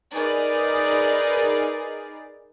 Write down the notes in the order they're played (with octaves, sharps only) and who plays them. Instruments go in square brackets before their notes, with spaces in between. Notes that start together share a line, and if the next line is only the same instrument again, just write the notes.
[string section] D#4 G#4 A#4 B4 D5